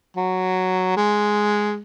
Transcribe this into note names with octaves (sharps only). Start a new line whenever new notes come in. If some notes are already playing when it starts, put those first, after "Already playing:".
F#3
G#3